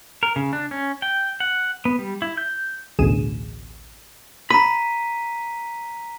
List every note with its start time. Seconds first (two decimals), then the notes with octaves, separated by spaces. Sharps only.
0.23 A#4
0.36 C#3
0.53 D4
0.71 C#4
1.02 G5
1.40 F#5
1.85 B3
1.99 G3
2.22 E4
2.37 G6
2.99 A1 D2 B2 G#4 D#7 E7
4.50 A#5 B5 B6 D#7